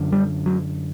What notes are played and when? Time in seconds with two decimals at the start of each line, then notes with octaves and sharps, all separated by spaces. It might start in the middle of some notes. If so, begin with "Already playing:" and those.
Already playing: F#2 D3
0.12 G3
0.46 F#3